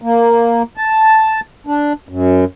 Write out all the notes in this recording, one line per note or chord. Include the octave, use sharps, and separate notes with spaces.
A#3
A5
D4
F#2